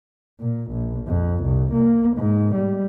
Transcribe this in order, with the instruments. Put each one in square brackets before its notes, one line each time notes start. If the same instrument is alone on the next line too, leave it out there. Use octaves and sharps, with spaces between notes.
[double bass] A#2
A#1
F2
C2
A#3
G#2
G3